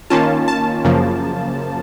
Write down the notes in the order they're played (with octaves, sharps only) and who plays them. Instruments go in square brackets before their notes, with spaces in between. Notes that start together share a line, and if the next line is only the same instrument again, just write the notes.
[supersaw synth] D#3 A#3 C#4 F4 A5
A5
F#2 C#3 F3 A#3